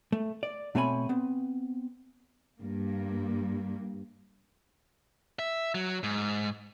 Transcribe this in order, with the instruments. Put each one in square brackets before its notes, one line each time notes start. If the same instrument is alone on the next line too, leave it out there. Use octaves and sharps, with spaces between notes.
[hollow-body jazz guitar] A3
D5
B2 A3 C4 C#5 G#5 B5
B3 C4
[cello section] G2 A#3
[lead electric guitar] E5
F#3
G#2